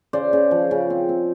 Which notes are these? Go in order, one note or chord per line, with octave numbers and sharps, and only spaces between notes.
C#3 C5 D5
C#3
F3
C#3
C4
C4